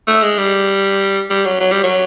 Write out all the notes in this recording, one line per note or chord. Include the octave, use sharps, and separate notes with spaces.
A3
G#3
G3
G3
F#3
F#3
G3
F#3